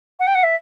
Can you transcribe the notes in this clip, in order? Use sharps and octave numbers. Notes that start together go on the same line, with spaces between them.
F#5
G5
F#5
E5